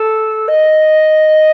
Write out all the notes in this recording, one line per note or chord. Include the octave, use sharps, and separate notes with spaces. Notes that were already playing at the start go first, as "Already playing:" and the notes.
Already playing: A4
D#5